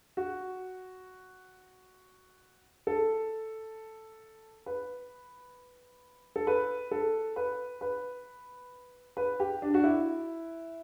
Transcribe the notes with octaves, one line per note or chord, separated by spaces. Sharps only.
F#4
A4
B4
A4
B4
A4
B4
B4
B4
G4
D4
F#4
E4